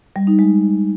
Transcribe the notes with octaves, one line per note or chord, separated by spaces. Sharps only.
G3
D#4
G#3